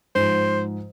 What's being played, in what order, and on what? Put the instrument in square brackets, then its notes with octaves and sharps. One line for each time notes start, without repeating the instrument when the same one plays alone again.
[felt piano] G#2 F3 [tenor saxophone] C5